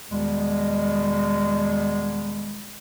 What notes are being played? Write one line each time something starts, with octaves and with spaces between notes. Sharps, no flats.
E2 B2 D#3 G3 G#3